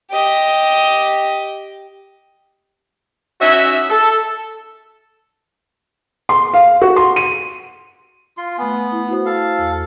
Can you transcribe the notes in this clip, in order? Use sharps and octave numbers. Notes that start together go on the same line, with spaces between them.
G4 D#5
C#4 D#4 E4 F#4 E5
A4
C6
F5
F#4
C6
D#7
F4 C6
A3 B3 G#5
E4
E4 F#4 C5
A4 F5
E2